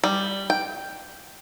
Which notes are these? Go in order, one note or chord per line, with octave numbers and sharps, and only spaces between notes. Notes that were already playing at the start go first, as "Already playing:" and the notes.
G3
G5